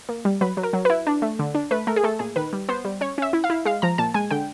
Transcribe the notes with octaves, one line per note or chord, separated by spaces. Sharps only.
A#3
G3
F#3 B4
F#3
A#4
F#3
E4 B4
D4
A3
D3
D4
A3 B4
A3 A#4
G#4
A3 A4
A#2 G#4
D#3 B4
G3
B3 C5
G3
C#4 C#5
C#4 E5
E4
F5
E4
G#3 F5
F3 A#5
A#2 A5
G#3 G#5
D3 G5